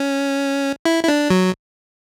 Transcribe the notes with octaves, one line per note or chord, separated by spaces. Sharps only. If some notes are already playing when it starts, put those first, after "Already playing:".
Already playing: C#4
E4
E4
D4
F#3